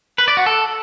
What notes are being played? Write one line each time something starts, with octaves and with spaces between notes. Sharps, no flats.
B4
D5
F#4
A4